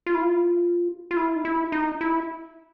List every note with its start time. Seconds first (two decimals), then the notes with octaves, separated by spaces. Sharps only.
0.06 F4
0.15 E4
0.22 F4
1.11 F4
1.17 E4
1.36 D#4
1.45 E4
1.72 D#4
2.01 E4